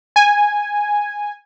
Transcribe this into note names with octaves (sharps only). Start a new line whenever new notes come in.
G#5